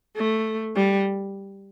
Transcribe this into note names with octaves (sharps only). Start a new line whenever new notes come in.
A3
G3